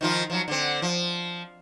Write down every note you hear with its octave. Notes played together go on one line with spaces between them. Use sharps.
D#3 F3 F4
F3 F#3
D3 C4
F3